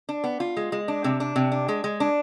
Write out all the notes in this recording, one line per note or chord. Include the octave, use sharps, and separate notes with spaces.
D4
B3
F4
G#3
G#3
D4
C3
D4
C3
D4
G#3
G#3
D4